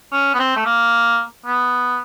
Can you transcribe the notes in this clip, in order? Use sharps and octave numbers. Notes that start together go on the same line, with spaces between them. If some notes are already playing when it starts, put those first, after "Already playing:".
C#4
B3
C4
A3
A#3
B3